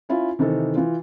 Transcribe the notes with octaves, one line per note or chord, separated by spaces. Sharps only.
C#4 E4 F4
C3 D#3 E3 D#4 A4
E3 F4